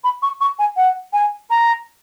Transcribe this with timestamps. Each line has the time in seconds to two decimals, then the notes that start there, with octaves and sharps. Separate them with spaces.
0.03 B5
0.22 C#6
0.40 C#6
0.59 G#5
0.76 F#5
1.13 G#5
1.50 A#5